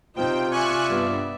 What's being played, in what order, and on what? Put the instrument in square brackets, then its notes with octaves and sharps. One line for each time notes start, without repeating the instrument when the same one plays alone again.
[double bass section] C3 [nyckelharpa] D#4 C5 [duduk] F4 [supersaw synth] G5
[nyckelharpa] D5 E5 [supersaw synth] G#5 C#6 F#6
[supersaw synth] G2 [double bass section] B3